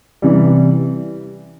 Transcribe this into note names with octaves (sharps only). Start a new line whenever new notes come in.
C3 E3 G3